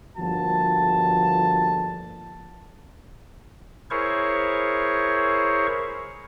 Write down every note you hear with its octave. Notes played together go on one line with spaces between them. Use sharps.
G1 F3 A#3 F#4 A5
E4 G#4 A#4 C5 C#5 C#6